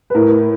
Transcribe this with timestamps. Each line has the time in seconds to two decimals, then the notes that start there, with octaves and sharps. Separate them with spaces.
0.10 B4
0.15 A2 A#4